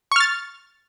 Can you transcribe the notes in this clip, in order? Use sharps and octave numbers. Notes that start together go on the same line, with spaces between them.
C#6 F6 A6